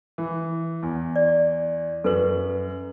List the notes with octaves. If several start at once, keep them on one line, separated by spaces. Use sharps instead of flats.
E3
E2
D5
F#2 A4 B4 F#7